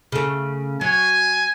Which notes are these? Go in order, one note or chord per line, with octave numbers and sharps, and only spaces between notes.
C#3 A3
F#3 G#5